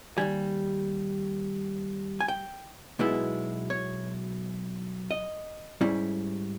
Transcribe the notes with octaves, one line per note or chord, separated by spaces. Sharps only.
D#2 D#3 G3 G#5
G#5
G5
B1 B2 G#3 B3 E4
C#5
D#5
G#2 G3 C#4 E4